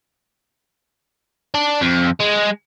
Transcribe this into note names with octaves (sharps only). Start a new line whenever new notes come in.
D4
F2
G#3